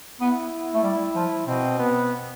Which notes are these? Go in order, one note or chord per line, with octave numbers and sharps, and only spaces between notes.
B3 E4
A3
G3
F3
B2 C4
B3